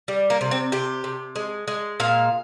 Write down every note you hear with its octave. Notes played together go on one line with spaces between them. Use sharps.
G3
A#3
C3
C4
C3 G4
C3
G#3
G#3
A#2 F5